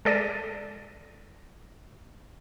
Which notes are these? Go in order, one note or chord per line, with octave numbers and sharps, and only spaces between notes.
G#3 A4 D5 A#6 D#7